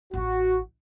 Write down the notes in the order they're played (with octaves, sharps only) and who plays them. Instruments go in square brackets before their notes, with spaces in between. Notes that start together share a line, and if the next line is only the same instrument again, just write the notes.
[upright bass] A1 E3 [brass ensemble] F#4